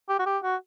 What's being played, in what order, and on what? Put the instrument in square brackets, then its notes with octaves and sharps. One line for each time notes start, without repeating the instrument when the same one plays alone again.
[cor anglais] G4
F#4
G4
F#4